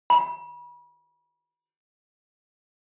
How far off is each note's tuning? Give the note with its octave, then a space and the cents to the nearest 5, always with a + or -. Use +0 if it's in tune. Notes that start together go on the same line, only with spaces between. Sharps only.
B5 -35